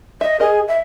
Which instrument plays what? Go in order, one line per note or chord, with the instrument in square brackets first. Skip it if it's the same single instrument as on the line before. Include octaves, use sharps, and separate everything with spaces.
[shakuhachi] D#5 [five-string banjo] E5
[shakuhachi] G#4 [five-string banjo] A#4 D#5
[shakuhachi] E5